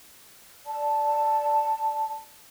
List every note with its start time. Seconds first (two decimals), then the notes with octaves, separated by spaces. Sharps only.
0.66 D5 A5